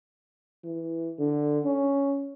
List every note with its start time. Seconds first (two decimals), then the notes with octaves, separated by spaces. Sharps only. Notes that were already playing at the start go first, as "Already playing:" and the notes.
0.64 E3
1.19 D3
1.65 C#4